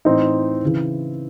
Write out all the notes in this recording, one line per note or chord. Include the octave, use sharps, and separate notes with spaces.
A2 E3 C4 D#4
C#3 E3